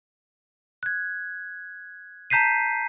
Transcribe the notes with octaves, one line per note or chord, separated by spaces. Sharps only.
F#6 G#6
A5 A#5 G6 B6 C7 D#7